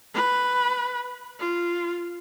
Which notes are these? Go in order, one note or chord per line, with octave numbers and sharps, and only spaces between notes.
B4
F4